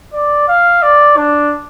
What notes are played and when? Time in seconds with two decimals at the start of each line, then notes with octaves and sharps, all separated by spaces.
0.14 D5
0.48 F5
0.82 D5
1.17 D4